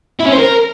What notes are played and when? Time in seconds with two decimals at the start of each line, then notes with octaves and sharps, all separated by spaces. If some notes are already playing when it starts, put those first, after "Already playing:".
0.20 E4
0.26 C#4
0.32 C5
0.38 A#4